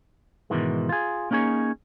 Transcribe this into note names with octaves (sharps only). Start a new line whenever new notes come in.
G#2 B2 D#3 E3 G#3
F4 G#4
A#3 C#4 D#4 G#4 C#5